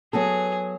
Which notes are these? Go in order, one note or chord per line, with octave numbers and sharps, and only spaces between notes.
F#3 B3 F#4 G#4 A4